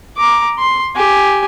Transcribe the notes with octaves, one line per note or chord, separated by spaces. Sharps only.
A#5 D6
C6
G4 G#5